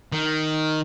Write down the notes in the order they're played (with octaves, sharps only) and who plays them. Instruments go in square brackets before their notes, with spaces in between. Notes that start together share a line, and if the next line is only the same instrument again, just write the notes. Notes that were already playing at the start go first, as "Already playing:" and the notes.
[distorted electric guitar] D#3